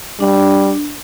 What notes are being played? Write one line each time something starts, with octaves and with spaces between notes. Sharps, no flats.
G3 D4